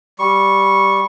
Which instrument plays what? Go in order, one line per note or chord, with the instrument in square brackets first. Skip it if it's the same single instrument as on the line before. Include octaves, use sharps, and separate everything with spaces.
[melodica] G3 C#6